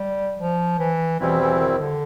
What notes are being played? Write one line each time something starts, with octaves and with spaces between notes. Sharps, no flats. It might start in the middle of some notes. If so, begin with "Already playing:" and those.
Already playing: G3
F3
E3
E2 B2 E3 G3 C4 E4
E3
E3
D#3
D3